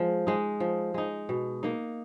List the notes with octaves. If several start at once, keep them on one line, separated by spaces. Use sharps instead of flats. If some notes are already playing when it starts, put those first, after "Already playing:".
Already playing: F3 G#3
G#3 D#4
F3
G#3 D#4
B2
A#3 D#4